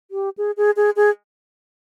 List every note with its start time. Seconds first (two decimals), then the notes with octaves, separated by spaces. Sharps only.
0.11 G4
0.38 G#4
0.57 G#4
0.77 G#4
0.96 G#4